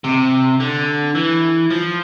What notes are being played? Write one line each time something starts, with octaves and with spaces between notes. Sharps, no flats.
C3
D3
E3
F3